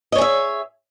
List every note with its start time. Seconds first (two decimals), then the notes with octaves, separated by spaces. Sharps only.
0.12 D#5
0.15 C#5
0.18 G#4
0.21 E5